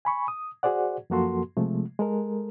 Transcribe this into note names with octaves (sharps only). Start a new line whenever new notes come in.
G#5 B5 C#6
D#6
F#4 G#4 C5 D5 F#5
F#2 F3 A#3 F#4 A4 C6
C3 F3 G#3 A3
G#3 A4 A#4